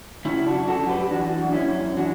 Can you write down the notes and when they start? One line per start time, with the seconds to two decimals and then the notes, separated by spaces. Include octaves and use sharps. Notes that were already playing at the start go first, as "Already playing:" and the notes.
0.25 C#3 C#4 E4
0.46 D4 F#4
0.53 F#2
0.67 F#4 A4
0.82 F#2
0.89 G4 B4
1.11 E3 D4 F#4
1.40 F#2
1.53 C#4 E4
1.68 F#2
1.96 E3 D4 F#4